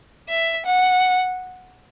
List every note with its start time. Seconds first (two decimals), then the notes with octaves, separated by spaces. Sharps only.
0.29 E5
0.66 F#5